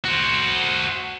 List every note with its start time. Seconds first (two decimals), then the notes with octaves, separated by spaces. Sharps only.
0.05 F#4 C5